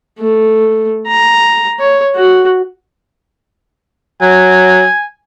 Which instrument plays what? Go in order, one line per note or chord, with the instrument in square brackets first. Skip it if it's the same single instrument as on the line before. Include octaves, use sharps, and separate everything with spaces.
[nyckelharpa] A3
A#5
C#5
F#4
[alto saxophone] F#3 [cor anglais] G#5